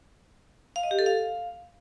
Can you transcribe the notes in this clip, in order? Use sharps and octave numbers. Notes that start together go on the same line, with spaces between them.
F5
D#5
G4
A4
F5